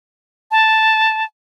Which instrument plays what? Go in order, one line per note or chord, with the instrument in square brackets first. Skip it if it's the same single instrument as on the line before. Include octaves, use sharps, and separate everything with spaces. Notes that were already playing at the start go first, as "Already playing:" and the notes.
[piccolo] A5